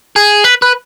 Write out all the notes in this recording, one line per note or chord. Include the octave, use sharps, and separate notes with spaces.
G#4
B4
B4